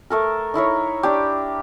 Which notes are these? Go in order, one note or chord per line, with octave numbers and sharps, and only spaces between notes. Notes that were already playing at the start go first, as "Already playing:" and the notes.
A3 A4 A#4
D#4 E4 A#4 C#5
D4 G4